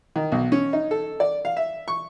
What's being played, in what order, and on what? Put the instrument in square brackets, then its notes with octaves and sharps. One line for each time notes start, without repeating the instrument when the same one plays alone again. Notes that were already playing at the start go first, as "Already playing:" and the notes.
[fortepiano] D#3
B1
C#4
D#4
A4
D5
F5
E5
C#6